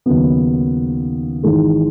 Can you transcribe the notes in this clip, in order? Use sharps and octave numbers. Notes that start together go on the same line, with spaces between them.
D#2 C#3 F#3 B3
G#1 G#2 E3 G#3